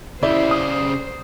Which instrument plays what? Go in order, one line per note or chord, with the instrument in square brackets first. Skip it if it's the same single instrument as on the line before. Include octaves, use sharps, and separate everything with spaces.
[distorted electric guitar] C#3 G4 [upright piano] E4 [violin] C5 [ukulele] D5
[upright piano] D#6